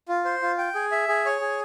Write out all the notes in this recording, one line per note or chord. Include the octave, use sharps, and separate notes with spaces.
F4
C5
F4
G5
G#4
E5
G#4
C#5
G#4